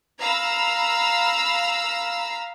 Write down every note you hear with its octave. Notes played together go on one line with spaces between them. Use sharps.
F5 A#5 B5 E6